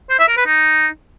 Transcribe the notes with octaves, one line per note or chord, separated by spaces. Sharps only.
C5
E5
A#4
B4
D#4